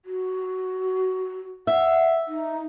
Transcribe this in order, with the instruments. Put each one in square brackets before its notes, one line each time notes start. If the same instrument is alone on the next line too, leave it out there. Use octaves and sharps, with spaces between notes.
[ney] F#4
[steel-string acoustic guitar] E5 [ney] F#5
[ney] D#4